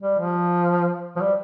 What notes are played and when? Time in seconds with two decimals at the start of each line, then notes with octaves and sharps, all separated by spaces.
0.03 G3
0.19 F3
1.16 F3
1.21 G3